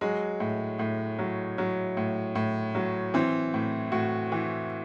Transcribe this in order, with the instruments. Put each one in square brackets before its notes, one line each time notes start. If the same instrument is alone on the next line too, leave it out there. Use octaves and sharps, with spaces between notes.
[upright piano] F#3 G#3
A2
A2
F#3
F#3
A2
A2
F#3
E3 C4
A2
A2 F#4
E3